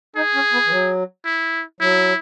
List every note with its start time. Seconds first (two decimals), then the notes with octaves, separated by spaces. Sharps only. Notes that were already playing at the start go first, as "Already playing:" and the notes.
0.16 D#4 G#4
0.34 C#4
0.53 B3
0.66 E3
0.71 F#3
1.25 E4
1.80 F#3 E4